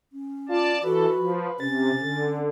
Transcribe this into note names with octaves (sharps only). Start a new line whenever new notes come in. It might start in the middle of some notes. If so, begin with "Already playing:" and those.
C#4
F4 D5 A5
E3 F#4 A4 B4
F3
C3 C#4 A6
D3